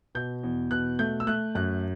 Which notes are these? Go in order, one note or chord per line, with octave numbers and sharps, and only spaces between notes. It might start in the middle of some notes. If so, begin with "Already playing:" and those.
B2 G6
E2
B2 F#6
A3 G6
E6
A3 F#6
F#2 F#6